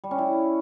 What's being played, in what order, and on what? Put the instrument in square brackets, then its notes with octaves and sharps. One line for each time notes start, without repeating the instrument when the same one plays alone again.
[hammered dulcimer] G3
C#4
E4